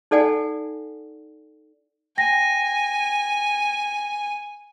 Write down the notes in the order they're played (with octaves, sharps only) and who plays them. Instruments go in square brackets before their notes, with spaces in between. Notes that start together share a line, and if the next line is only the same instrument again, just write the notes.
[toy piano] D#4 A4 D5 F#5 G#5
[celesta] G5 A#6 [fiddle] G#5